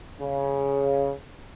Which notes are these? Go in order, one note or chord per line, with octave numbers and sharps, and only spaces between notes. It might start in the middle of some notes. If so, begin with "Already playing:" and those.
C#3